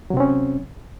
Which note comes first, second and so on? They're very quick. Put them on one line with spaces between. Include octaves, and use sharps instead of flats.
F#3 C3 C4 C#4